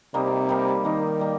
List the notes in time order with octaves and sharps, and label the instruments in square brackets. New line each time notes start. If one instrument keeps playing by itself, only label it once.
[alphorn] C3 [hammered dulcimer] G3 A#3 D#4
[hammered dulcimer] G3 A#3 D#4
[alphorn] D#3 [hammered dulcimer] G3 A#3 D#4
[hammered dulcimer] G3 A#3